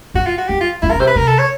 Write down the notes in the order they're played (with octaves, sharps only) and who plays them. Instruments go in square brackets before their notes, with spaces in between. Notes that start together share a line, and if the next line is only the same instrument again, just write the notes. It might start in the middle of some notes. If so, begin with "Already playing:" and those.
[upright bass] G2 [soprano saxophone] F#4
[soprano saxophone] F4
F#4
[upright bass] F#2 [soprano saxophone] G4
[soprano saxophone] F4
[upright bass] G2 [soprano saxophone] E4
[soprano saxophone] A#4
[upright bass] B2
[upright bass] C3 [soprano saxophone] C5
[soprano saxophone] B4
[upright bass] C3 [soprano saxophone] A#4
[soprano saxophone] A4
C#5